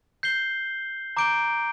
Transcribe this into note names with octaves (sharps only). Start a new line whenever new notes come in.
G6 C7 G7
A#5 D6 G6 D7 G7